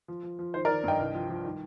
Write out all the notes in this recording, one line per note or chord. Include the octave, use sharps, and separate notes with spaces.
F3
F3
F3
D#3 C5
A#4 D5
D#3
G2 D#5 G5
C2
F3
F3
D#3